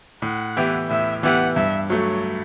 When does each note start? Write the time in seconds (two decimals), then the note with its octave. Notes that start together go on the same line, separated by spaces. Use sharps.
0.22 A2 F#5
0.57 E3 B3 E4 G4
0.90 A2 E5
1.23 E3 B3 E4 G4 F#5
1.56 G2 E5
1.90 F#3 A3 C#5